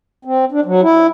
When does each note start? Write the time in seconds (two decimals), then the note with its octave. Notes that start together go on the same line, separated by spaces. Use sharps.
0.25 C4
0.52 D4
0.65 F#3
0.82 E4